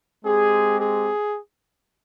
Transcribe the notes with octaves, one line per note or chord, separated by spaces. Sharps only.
G#3 C4 G4 G#4
G#4